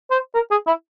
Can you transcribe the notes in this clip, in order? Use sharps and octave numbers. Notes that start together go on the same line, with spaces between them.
C5
A#4
G#4
E4